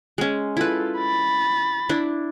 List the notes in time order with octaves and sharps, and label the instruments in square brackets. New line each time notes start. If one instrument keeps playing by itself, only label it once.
[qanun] G#3 C#4
[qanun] E4 B4 [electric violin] F4 A4
[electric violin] B5 A6
[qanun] D4 E4